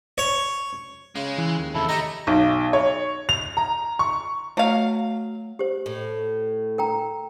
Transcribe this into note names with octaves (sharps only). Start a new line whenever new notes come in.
C#5
C#3 G#3
E3
D#2
F2 C3 E4 A4
A3 G4 D#5 A#5
B1
C#5
F7
A#5
C#6
F#3 A3 F5
G4 C5
A2
A#4 G5 A#5